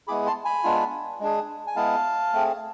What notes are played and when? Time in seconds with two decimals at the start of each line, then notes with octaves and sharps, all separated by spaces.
0.07 G#3 B3 E4 G#4 B5 D6
0.26 A5 C6
0.45 G#5 B5
0.64 G#3 B3 D4 F4
1.20 G#3 D4 G#4
1.67 G#5
1.76 G#3 B3 E4 G#4 F5 A5
2.33 A3 C4 G#4